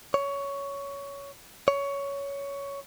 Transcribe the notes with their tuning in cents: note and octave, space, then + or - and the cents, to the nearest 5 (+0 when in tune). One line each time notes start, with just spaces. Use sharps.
C#5 +15
C#5 +15